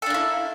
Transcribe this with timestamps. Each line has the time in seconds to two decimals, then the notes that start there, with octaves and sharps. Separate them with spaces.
0.02 A4
0.06 D4
0.10 A#3
0.14 E4